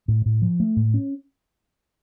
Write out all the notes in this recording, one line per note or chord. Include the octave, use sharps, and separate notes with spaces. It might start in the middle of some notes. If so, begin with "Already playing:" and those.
A2
A2
F3
A3
A2
C#4